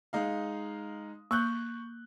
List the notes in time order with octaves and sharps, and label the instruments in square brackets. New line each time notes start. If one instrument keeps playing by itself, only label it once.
[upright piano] G#3 D#4 F5
[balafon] A#3 [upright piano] C#6 F#6 G6